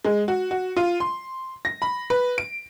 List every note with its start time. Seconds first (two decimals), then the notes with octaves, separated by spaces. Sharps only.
0.05 G#3
0.28 F#4
0.51 F#4
0.77 F4
1.00 C6
1.65 A#6
1.82 B5
2.10 B4
2.38 D7